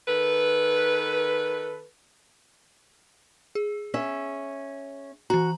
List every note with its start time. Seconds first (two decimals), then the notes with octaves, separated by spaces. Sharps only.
0.08 D#3 A4 B4
3.55 G#4
3.94 C#4 E5
5.30 E3 F#4 A#5